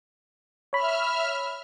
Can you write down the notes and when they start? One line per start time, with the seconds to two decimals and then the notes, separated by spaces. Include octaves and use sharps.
0.73 C#5 E5 B5 F6